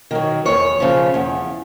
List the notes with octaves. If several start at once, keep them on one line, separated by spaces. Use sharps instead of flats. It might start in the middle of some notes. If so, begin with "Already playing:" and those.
D#3 F#3
E2 C#5
C#3 F3
E2